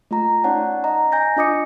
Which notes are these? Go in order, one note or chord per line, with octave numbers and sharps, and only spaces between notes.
A3 F4 A#5
C#4 D#4 C#5 D5 F#5 A5
D#5 A#5
G#5 G6 A#6
D4 F4 D#5 D6 D#6 C#7